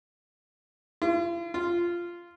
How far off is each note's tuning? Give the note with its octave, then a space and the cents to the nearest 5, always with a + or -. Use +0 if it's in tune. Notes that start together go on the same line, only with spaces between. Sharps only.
F4 -45
F4 -10